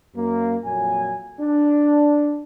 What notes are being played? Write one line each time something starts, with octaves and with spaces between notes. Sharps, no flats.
F#2 A#3
F2 A#2 F#3 G#5
D4